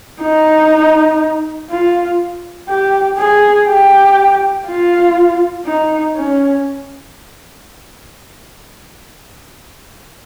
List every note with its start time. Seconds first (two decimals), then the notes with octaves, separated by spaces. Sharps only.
0.21 D#4
1.70 F4
2.69 G4
3.18 G#4
3.68 G4
4.66 F4
5.66 D#4
6.16 C#4